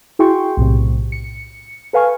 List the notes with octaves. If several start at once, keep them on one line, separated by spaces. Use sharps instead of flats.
E4 F#4 G#4 G5 C6 C#6
B1 A2 C3
C#7
A4 B4 F5 G#5 C#6 F6